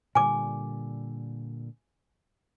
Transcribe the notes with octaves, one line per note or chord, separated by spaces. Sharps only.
A#2 D3 G3 G#5 D6